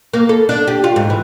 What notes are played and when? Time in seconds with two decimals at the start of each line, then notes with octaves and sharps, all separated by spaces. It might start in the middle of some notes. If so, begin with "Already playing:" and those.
0.13 A#3
0.29 A4
0.49 D4
0.68 G4
0.84 F4
0.96 G#2
1.10 E3